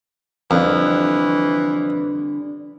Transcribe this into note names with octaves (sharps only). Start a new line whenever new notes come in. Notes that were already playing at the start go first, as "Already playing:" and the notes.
F2 D3 E3 G3 D4